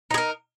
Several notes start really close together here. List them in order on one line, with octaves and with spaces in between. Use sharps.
D#4 G#4 A#4